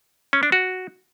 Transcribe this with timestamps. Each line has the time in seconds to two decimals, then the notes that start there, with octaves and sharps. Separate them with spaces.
0.33 C#4
0.43 D4
0.52 F#4